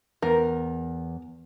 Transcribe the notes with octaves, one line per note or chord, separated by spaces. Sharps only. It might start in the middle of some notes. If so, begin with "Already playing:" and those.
E2 A#4